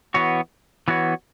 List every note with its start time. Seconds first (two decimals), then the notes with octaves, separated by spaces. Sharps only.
0.14 E3 B3 F#4 C#5
0.88 E3 B3 F#4 C#5